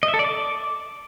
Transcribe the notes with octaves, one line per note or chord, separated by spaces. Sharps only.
D#5
E5
A4
D5
D6